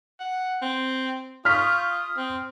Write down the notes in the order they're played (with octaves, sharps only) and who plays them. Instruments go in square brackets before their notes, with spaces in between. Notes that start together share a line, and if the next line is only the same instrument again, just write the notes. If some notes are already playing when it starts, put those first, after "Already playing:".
[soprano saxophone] F#5
C4
[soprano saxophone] F4 [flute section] C#6 D#6 G6 [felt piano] F6 B6
[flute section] D#6
[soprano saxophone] C4